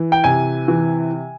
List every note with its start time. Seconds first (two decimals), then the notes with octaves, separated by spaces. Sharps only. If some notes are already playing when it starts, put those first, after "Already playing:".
Already playing: E3
0.12 G5
0.24 C3 G#5
0.68 E3